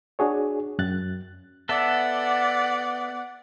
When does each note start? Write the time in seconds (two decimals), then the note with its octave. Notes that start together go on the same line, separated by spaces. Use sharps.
0.19 D4 F#4 G#4 C#5
0.79 F#2 F#6 A6
1.69 B3 A4 D5 E5 F#5